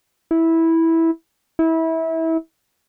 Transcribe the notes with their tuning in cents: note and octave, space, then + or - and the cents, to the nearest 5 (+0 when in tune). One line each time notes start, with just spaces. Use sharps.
E4 -10
E4 -25